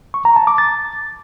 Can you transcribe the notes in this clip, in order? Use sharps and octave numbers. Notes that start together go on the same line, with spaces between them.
C#6
A#5
A5
D6
A6